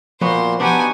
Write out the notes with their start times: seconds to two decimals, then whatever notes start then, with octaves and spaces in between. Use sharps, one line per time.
0.21 A#2 F3 B3 F#4 C5 C6
0.60 B3 D4 D#4 F#4 G4 G#5